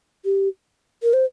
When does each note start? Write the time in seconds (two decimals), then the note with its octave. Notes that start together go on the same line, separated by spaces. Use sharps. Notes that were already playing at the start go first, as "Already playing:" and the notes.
0.25 G4
1.03 A#4
1.13 C5